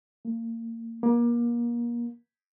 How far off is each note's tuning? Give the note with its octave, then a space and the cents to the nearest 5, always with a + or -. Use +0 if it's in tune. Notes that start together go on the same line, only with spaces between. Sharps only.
A#3 -30
A#3 +30